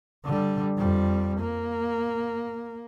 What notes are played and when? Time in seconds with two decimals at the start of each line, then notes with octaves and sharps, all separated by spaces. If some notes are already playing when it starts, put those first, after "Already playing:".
0.25 D3 G3
0.78 F2 G3
1.40 A#3